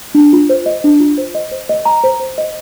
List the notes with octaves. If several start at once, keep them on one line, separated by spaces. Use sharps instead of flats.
D4
F4
C5
D#5
D4
F4
C5
D#5
C5
D#5
A#5
C5
C5
D#5